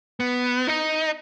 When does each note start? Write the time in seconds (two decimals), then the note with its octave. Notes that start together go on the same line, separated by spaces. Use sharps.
0.20 B3
0.67 D#4